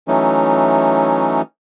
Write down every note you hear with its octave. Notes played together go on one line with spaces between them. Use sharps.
E3 F#3 A3 C#4 D#4